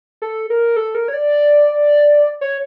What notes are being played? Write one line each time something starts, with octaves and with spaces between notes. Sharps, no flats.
A4
A#4
A4
A#4
C#5
D5
C#5